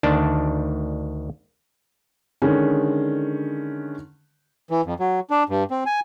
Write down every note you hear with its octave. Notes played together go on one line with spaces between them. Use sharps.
D2 D#3 D4 D5 A5
D3 D#3 G#3 C#4
E3
F2
F#3
D4
G2
C4
G#5